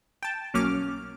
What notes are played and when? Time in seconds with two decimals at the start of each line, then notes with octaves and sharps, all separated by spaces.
0.23 G5 A5
0.54 B1 F#3 A#3 C#4 D6 F6